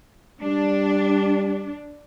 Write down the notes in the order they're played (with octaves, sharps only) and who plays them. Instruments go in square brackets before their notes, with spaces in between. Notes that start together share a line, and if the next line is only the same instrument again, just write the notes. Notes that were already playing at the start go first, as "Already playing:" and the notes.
[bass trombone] G3 [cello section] D4